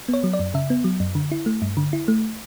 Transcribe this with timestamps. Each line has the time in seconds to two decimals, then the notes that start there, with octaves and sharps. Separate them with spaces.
0.08 B3
0.13 C#5
0.24 F#3
0.33 D5
0.39 F#2
0.54 C#3 E5
0.70 B3
0.84 F#3
1.00 F#2
1.15 D3
1.31 E4
1.46 A3
1.62 G2
1.77 D3
1.93 E4
2.08 A3